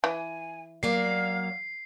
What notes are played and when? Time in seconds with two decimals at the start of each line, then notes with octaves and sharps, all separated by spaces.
0.04 E3 G#5
0.83 F#3 A#3 D5 F5 C7